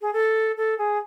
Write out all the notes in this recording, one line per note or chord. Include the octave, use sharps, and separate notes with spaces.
G#4
A4
A4
G#4